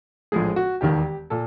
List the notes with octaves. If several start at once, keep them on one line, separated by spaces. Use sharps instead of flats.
A#1 A2 F3 G#3 G#4
F#4
E1 D#2 D#3 G4
A#2 A4